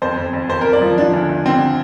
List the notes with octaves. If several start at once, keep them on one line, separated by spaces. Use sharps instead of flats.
F2 C5
F2
F2
F2 C5
F2 A#4
D5
F3
F3 D4
D2
D2
D3 C4